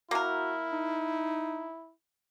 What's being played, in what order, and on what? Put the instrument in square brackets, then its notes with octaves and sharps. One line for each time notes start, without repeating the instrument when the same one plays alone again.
[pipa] A#3 A#4 [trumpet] E4 [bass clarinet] F#4
[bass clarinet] D#4